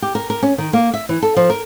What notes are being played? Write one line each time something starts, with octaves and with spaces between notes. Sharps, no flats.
G4
A#4
A#4
C#4
D#3
A#3
E5
E3
A4
F3
A#4